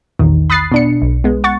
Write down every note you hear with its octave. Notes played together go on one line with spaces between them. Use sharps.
A#1 E2 D#3
B5 D#6 F#6 A6 C7
B2 D4 C#7
B1
G#3 B3
F#5 C#6 A6